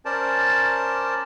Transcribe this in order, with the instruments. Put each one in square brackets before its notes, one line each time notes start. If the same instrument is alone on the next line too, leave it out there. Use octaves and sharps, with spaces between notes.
[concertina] C#4 A#4 C5 D5 A5